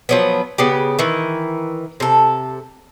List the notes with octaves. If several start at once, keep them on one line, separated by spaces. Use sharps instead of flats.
F3 F#3 B3
C#3 B3 G4
D#3 E3
C3 A4